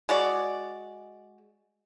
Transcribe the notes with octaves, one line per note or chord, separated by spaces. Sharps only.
G#3 F#4 D5